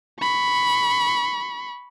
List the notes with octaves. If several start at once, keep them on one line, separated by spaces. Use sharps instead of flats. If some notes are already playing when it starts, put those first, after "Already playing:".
B5 C#6